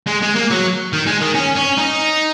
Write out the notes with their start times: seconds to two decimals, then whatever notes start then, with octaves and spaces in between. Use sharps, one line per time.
0.07 G#3
0.22 G#3
0.35 A#3
0.50 F#3
0.93 D#3
1.07 G#3
1.22 D#3
1.35 C#4
1.57 C#4
1.78 D#4